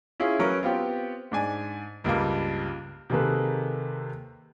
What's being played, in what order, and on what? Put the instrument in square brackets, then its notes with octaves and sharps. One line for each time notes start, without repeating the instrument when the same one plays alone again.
[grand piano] C#4 E4 F4 G#4
F#3 C#4 A#4 B4 C#6
B3 C4 F4 G4
G#2 D4 G#5
C#2 G2 G3 A#3
C3 D#3 A#3 G#4 A4 B4